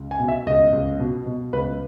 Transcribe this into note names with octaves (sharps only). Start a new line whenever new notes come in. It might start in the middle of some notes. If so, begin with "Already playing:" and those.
Already playing: C#2
G#5
B2
E5
C#2 D#5
C#2
B2
B2
C#2 B4